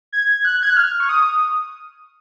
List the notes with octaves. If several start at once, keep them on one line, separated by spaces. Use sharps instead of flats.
G#6
F#6
G#6
F#6
F6
C#6
D#6